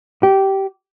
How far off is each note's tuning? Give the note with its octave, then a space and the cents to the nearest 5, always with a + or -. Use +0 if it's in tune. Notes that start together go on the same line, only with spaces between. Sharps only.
G4 -15